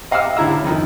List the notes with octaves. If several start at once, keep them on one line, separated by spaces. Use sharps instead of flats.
D#5 F5 F#5 D6 E6 F6
C#2 D3 E4 A#5 E6
F2 D#3 F3